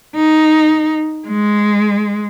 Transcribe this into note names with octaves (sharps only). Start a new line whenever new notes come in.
D#4
G#3